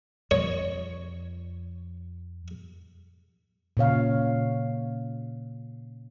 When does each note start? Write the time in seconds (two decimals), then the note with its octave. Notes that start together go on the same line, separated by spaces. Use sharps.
0.31 F2 F3 C#5
3.77 A#2 C#3 C#5 F5